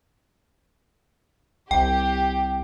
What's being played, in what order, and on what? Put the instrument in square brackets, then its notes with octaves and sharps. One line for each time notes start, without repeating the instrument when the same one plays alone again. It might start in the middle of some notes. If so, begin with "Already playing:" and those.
[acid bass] C2 [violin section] G4 [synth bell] G5